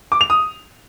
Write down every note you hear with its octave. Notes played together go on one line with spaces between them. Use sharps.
D6
F7
D#6